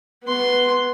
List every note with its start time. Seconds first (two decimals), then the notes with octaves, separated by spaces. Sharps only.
0.24 B3 C6